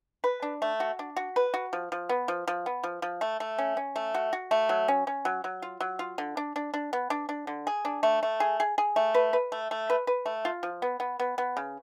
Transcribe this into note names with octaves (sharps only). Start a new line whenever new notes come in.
B4
D4
A3
F#4
D4
F#4
B4
F#4
F3
F3
B3
F3
F3
B3
F3
F3
A3
A3
C#4
C#4
A3
F#4
F#4
A3
F#3
C#4
C#4
F#3
F#3
F4
F#3
F4
D3
D4
D4
D4
B3
D4
D4
D3
G#4
D4
A3
A3
G#4
G#4
G#4
A3
B4
B4
A3
A3
B4
B4
A3
F4
F3
B3
B3
B3
B3
C#3